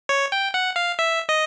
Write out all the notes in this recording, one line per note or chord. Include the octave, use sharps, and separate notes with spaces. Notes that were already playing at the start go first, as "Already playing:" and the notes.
C#5
G5
F#5
F5
E5
D#5